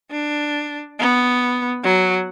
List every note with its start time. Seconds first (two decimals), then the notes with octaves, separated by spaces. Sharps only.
0.11 D4
0.99 B3
1.84 F#3